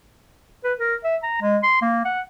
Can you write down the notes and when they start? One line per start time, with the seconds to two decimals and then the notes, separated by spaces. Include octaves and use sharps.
0.64 B4
0.79 A#4
1.04 E5
1.23 A#5
1.41 G#3
1.63 C6
1.81 A#3
2.05 F#5